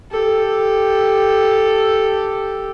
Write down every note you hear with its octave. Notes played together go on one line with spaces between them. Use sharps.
G4 A4